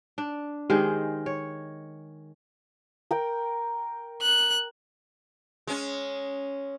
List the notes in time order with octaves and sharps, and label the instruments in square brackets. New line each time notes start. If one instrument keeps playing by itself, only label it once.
[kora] D4
[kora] D#3 G#3 C5 [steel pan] G4 G#4
[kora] C#5
[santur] A#4 G5
[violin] F#6
[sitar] G#3 C#4